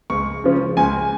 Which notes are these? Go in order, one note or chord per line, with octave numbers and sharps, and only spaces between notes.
C#2 C#6
C#3 F3 C#4
C#2 G#5